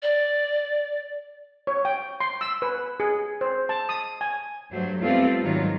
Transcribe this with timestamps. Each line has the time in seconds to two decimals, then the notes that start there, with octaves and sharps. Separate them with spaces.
0.03 D5
1.67 C#5
1.85 G5
2.20 C6
2.41 E6
2.62 B4
3.00 G#4
3.41 C5
3.69 A5
3.89 D#6
4.21 G#5
4.70 G2 F#3 A3 C5
5.01 G3 A3 B3 C4 F4 A4
5.42 G#2 D#3 F#3 G3 F4